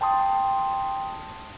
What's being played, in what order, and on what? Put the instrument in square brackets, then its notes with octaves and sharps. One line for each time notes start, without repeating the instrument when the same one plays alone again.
[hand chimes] G5 A5 C6 D#6